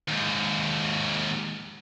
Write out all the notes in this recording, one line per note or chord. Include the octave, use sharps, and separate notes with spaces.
D#2 G#2